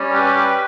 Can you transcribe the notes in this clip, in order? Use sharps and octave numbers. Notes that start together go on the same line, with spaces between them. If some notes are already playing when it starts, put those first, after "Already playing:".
Already playing: G3 C#4
G4 B4